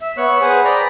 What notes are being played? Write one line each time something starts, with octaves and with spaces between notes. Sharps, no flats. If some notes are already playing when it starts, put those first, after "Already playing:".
E5
B3 C#5 C#6 F#6
G#4 B4 C5 F#5 G#5 D#6
D5 G5 A#5 B5